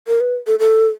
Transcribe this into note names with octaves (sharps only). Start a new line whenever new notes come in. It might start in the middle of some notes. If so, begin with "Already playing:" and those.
A#4
B4
A4
A4